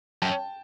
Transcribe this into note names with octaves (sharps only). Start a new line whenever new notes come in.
F#2 G5 A5